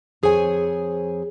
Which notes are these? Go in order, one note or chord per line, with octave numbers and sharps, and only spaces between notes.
F2 G#4 C5 C#5 G#5